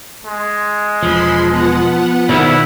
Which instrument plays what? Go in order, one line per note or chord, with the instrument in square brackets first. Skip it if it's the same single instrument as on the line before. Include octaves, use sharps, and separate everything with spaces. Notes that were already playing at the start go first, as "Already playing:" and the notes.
[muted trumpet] G#3
[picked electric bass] E1 [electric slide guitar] F3 [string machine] B5 C6
[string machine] B3 F#5
[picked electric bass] B2 D#3 [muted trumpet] E4 [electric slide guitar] A#4 C5 D5